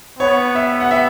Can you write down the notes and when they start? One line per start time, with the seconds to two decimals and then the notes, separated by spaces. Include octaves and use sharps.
0.19 B3 C#5
0.55 E5
0.80 F#5
0.91 E5